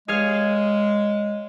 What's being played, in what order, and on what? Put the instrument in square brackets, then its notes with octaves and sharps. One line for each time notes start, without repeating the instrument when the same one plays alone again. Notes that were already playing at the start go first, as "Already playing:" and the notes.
[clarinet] G#3 [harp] G#4 C#5 F5